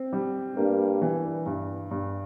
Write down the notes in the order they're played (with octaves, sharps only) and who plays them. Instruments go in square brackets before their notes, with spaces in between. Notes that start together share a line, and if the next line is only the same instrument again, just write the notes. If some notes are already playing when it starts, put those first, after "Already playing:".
Already playing: [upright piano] C4
G3
[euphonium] G2 [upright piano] A#3
[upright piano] E3
G2
G2